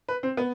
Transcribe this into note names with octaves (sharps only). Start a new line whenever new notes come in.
B4
C4
B3